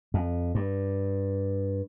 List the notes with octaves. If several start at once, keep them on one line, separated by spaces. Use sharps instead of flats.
F2
G2